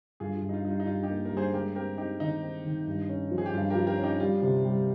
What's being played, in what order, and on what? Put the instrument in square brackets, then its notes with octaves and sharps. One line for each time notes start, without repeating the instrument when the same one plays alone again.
[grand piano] G2 [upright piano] F4 G#4
[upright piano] F4
[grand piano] G2
[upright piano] D#4
F4
[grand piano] G3 [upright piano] D#4
[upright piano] F4
D#4
[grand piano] G2 [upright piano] F4
[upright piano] D#4 G4
[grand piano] A#3
[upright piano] A#4
[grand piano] G2
[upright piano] G#4 C5
[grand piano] G#3 [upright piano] G4 A#4
[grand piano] C4 [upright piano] G4 A#4
[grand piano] C4 [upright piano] D#4 G4
[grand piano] D#3 [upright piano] D#4
[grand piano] C4
D#3
G2
C#4
F3
[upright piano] G#4
G4
[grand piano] G2 [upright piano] F4
[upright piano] G4 A#4
[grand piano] F3
[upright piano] G4 A#4
[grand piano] C#4
[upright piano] D#4 G4
[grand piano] G3 [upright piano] F4
[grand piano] C3
G3